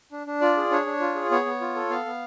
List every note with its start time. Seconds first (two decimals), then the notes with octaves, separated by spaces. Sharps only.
0.12 D4
0.27 D4
0.41 F4 D5
0.57 G#4
0.71 D4 C#5
0.86 D4
1.00 F4
1.15 G#4
1.31 B3 C#5
1.46 B3
1.61 F4
1.76 A4
1.90 B3 F5
2.06 B3